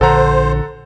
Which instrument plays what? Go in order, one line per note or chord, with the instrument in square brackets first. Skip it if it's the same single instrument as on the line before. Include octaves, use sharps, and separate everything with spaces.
[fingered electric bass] A#1 D3 [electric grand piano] A4 F#5 A#5 [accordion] C5